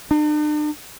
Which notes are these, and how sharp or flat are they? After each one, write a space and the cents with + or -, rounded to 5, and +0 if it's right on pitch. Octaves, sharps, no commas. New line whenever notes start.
D4 +45